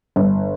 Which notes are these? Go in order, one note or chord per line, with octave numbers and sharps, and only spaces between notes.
G1